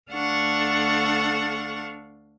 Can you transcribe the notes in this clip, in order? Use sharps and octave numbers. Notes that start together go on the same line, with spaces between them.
D2 D4 A4 F5 F#5 C#6